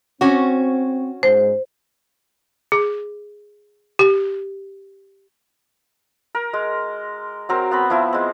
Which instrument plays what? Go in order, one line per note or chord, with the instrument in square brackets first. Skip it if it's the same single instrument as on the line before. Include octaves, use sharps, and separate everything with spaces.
[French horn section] C4 [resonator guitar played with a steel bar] C#4 F#4
[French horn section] G#2 [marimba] C5
[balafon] G#4
G4
[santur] A#4
G#3
F#3 C4 A#4
B3 C4 B5
F3 B3 E4 E5
G#3 C4